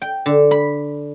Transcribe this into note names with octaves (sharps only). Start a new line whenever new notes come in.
G5
D3
B5